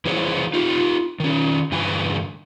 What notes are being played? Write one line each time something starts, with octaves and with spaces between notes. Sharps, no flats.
E3 E4 F#4 G#4 C5 C#5
D#4 F4 G4
D#3 C#4
G2 D3 E3 G#5